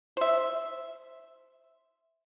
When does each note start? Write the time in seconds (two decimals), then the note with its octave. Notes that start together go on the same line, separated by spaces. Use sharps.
0.17 C5 E5